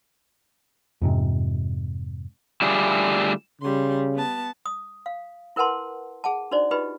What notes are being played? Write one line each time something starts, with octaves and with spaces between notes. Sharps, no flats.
F2 G#2 C3
D3 G3 A3 E4 F4 G#4
C#3 G3 C6
B3 A5
D#6
F5
E4 A#4 B4 F#5 A5 C6
G#4 F#5 A5
D4 D#4 F#4 C5 D5
D#4 F4 G4 B4 D#5